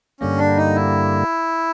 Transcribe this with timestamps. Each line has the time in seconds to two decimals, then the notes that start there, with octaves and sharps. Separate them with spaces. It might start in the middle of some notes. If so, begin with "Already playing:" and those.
0.20 G2 D3 G3 A#3 C#4
0.38 D4
0.57 D#4
0.75 E4